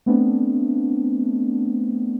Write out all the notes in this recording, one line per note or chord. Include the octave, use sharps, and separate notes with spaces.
A3 B3 C4 D4